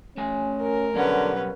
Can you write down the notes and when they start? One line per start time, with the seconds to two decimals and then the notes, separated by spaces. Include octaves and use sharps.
0.17 A3 C#4 G#5
0.62 A#4
0.95 B1 D3 G3 C#4 B4 F#5